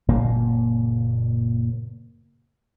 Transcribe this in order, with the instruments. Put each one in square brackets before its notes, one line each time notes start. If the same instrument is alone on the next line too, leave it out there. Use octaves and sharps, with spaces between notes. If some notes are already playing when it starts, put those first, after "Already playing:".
[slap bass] F#1 A#2 A#3